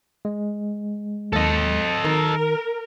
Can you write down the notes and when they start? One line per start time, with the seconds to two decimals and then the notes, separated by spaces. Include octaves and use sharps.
0.25 G#3
1.33 D#2 A4 D#5
2.05 D#3 A#4